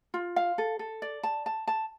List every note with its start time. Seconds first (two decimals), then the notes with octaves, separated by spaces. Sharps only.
0.14 F4
0.36 F5
0.58 A4
0.79 A4
1.02 D5
1.23 A5
1.46 A5
1.67 A5